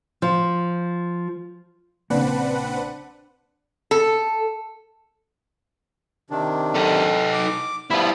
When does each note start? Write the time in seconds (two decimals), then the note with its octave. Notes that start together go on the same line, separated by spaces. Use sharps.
0.22 F3
2.10 A#1 C#3 A#3 C4 D4 B4 F#5
3.91 A4
6.30 C3 D#3 D4
6.75 D#4 A4
7.32 D6
7.90 F3 G3 B3 E4 F4